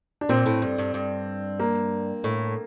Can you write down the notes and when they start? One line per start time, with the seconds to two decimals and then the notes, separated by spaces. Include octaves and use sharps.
0.21 D4
0.29 A#2 C4
0.46 A2
0.62 G2
0.78 G2
0.94 G2
1.60 A#3
2.24 A2